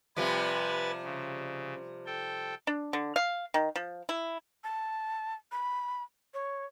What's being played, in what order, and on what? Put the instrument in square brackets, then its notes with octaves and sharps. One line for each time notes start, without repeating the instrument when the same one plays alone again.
[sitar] C3 F3 G3 [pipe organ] B4 G#5 A6
[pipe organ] C#3
A4 G5
[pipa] D4
D3
F5
D#3
F3
E4
[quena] A5
B5
C#5